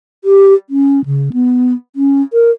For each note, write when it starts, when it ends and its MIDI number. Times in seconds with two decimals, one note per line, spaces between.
0.24 0.54 67
0.70 1.04 61
1.06 1.29 49
1.33 1.73 59
1.96 2.22 61
2.33 2.51 70